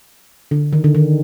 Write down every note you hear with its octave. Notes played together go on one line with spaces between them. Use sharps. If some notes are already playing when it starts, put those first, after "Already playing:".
D3
D#3
D3
D#3